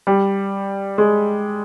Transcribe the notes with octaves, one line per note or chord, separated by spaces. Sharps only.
G3
G#3